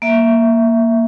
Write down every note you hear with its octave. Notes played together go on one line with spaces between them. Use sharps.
A#3 E5